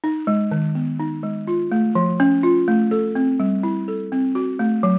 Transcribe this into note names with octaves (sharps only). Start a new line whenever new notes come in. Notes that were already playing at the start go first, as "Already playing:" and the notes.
D#4
G#3
D#3
B3
D#4
G#3
F4
A3
F3
C#4
F4
A3
A4
C4
G3
E4
A4
C4
F#4
A3
F#3